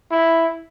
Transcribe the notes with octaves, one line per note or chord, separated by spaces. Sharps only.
E4